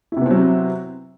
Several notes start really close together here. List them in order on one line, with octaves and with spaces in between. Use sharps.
E4 C3 B3 C4 F#3